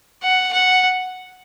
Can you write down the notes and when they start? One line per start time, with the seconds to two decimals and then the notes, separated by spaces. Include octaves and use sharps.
0.23 F#5
0.53 F#5